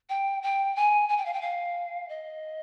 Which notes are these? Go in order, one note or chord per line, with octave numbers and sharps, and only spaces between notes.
G5
G5
G#5
G#5
G5
F5
G5
F5
D#5